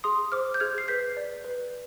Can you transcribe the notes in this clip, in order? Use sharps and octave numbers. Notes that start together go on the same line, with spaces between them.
G#4 C6 D#6
C5 D6 F6
G6
G#4 F6 G#6
C7
B4 G6 B6
D5
B4